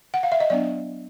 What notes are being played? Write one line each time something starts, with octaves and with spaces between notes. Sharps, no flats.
F#5
F5
E5
D#5
F#3 B3 D4 D5